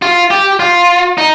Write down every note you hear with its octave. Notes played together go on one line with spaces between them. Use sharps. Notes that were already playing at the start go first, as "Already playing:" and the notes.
F4
G4
F4
D#4